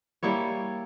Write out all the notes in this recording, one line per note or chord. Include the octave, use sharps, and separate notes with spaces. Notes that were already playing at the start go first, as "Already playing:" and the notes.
G3 A#3 E4 C#5